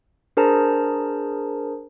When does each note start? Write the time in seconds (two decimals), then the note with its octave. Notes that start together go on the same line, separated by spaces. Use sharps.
0.37 D4 G#4 A#4 C5 A5 A#5